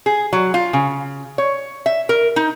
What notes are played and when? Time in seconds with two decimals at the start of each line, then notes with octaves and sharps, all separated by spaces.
0.06 G#4
0.33 F#3
0.54 F4
0.73 C#3
1.38 C#5
1.86 E5
2.09 A#4
2.36 D#4